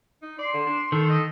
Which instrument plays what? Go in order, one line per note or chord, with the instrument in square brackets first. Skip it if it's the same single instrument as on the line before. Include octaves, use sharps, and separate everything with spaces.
[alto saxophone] D#4
[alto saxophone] D5 [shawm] C6
[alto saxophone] D3
D4
[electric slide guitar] D#3 [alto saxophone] A4 [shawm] C5
[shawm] D#5